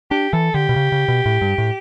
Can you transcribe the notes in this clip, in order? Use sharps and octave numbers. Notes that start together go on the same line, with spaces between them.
D4 G4
E3 A4
D3 G4
B2
C#3
C#3
B2
A2
G2
A2